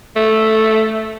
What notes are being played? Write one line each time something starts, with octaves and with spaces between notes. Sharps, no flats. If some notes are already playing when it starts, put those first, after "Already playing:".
A3